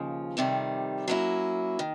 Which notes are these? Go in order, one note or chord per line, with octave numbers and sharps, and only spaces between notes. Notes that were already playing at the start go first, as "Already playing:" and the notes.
Already playing: D#2 C#3 F3
F2 C3 D#3 G3
F#3 A#3 C#4 E4
D#3